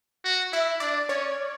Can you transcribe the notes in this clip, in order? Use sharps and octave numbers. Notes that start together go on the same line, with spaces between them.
F#4
E4 E5
D4 D5
C#4 C#5